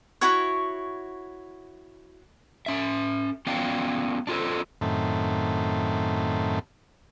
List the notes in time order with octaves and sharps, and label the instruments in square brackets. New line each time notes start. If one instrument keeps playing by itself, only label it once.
[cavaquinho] E4 F#4 C#5
[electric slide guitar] C#4 E5
B3 C#4 F4 D5 F5 G5
D4 F4 A4 C5
[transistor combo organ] F#2 A2 D#3 A3 C4